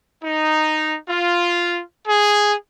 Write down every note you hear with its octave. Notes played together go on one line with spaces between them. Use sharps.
D#4
F4
G#4